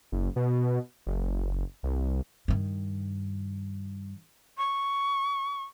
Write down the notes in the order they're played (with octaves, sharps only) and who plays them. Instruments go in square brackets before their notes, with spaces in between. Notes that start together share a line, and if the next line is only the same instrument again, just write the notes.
[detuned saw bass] F#1
B2
F#1
C2
[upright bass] G2 D#3
[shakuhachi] C#6